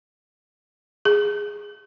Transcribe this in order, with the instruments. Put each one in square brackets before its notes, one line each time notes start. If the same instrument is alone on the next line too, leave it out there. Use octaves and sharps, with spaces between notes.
[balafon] G#4